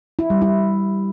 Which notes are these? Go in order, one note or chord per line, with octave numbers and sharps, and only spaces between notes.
E4
G3
E4